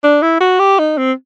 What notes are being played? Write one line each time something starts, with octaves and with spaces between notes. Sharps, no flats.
D4
E4
F#4
G4
D#4
C4